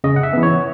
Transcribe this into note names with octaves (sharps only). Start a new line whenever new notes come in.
C#3 D#5
F#5
E5
E3 B3
C#5